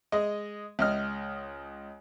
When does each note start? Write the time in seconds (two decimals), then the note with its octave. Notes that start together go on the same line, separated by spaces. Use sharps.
0.12 G#3 D#5
0.79 C#2 D#5 F6